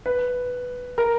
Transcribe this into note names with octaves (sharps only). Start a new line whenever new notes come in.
B4
A#4